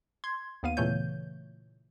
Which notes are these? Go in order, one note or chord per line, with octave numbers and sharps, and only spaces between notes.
C6 G#6
D#2 B3 F5 D#7
A#2 C#3 E3 A3 C#5 G6